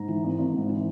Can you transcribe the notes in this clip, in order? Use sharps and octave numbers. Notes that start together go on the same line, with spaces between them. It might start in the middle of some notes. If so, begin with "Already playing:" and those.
Already playing: G#2 A#5
E3
G#1
G#1
G#2
E3